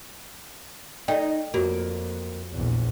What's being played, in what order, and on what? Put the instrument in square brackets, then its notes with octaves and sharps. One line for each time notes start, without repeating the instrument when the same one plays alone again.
[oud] D#4 [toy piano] A4 D5 G5
[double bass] F2 [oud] A#3 [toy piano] F4 F#4 C#5
[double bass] A#1 E2